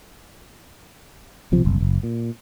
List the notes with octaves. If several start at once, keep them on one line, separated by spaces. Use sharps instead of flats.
B1 C3 F3
F#1 C2
F#1
A#2